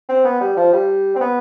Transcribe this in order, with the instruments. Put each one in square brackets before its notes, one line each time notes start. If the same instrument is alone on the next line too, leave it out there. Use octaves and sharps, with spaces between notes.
[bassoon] C4
B3
G3
F3
G3
C4
B3